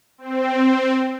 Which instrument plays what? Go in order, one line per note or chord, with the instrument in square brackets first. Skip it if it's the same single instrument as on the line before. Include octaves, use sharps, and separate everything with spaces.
[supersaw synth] C4